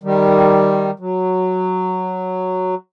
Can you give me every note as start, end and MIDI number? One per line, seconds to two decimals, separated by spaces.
0.03 0.91 51
0.03 0.91 55
1.00 2.75 54